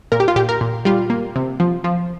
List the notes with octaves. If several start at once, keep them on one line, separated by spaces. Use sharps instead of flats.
A#2 A#4
G4
F4
A#2 G4
A#4
A#2
G3 F4
A#3
C3
F3
F3